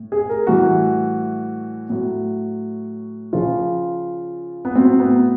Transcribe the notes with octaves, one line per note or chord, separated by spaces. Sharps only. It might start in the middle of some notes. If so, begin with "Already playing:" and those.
Already playing: A2
G#4
A#4
A2 E3 G3 F#4
A2 F#3
C#3 F3 F4
B3
A2 F#3 C4
B3